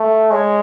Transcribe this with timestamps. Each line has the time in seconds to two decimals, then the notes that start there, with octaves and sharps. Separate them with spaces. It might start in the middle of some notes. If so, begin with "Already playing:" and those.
Already playing: A3
0.30 G#3 C#5